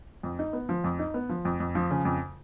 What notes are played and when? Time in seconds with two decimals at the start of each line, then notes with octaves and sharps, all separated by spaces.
0.23 F2
0.39 D#4
0.53 B3
0.69 F3
0.84 F2
0.99 D#4
1.14 B3
1.29 F3
1.45 F2
1.60 F2
1.75 F3
1.91 C#3
2.05 F2